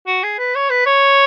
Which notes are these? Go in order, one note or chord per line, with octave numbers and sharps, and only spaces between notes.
F#4
G#4
B4
C#5
B4
C#5